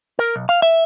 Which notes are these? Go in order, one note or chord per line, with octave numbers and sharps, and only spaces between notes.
A#4
B1
F5
E5